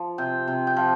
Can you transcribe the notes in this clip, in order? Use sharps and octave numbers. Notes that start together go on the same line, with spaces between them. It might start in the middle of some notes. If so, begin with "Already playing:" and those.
Already playing: F3
C3 G5
C3
G5
F3